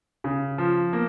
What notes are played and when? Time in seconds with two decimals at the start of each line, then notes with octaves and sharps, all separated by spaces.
0.24 C#3
0.58 F3
0.93 A#3